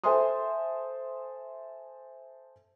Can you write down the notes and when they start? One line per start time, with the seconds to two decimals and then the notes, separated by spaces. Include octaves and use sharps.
0.04 A4 C5 E5 G#5 C6 D#6